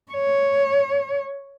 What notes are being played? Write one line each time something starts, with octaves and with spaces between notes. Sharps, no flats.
C#5